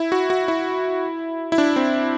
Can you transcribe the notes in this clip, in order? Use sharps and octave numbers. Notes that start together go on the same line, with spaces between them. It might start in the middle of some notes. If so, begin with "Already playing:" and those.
Already playing: E4
F#4
F#4
E4
E4
D4
C4